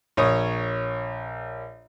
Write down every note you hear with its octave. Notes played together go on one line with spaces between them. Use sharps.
A#1 C#5 D#6